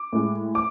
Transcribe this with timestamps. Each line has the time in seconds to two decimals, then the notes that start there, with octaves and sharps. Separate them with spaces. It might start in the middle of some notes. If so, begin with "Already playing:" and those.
Already playing: D6
0.13 A2 G#3
0.55 D6